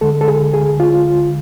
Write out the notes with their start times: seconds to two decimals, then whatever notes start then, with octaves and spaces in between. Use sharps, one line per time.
0.01 D2 D3 G#3 A4
0.21 A4
0.28 G#4
0.54 G#4
0.80 F4